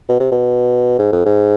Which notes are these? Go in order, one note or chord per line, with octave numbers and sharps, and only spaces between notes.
B2
C3
B2
G#2
F2
G#2